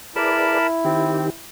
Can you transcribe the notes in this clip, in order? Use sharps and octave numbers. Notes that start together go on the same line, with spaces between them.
E4 G#4 A#4 B4 D5 A5 B5
D#3 C4 G4